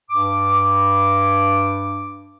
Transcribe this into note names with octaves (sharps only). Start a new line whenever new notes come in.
G2 D6